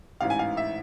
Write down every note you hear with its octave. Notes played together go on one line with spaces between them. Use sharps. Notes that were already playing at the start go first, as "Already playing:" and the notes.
A1 G#2 E3 F5
G#5
F5
E5